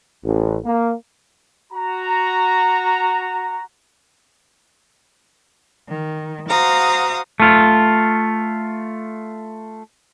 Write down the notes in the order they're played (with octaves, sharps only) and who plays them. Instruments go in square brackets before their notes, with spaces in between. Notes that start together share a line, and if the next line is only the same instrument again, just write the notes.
[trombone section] A1
A#3
[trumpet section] F#4 A#5
[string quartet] D#3
F#4 C5 F5 A#5 D#6
[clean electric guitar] A3 F4